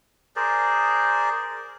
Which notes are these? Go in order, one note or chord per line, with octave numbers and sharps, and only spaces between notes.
G#4 A#4 C5 D5